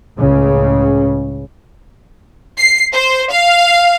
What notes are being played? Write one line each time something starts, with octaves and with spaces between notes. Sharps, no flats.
C#2 A2 C#3
C7
C5
F5